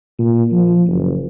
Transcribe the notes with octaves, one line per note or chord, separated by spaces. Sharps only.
A#2
F3
F#1